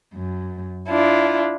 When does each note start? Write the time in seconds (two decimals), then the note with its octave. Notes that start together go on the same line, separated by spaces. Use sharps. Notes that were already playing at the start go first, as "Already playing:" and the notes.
0.15 F#2
0.88 D4 E4 F4